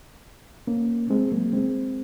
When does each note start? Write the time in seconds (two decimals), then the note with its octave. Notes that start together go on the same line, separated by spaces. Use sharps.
0.67 A#3 C#4
1.10 G#3 C4
1.32 F#3 A#3
1.53 G#3 C4